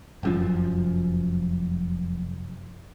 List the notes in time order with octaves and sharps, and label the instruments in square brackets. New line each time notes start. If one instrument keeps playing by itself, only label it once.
[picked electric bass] F1 F#2 F3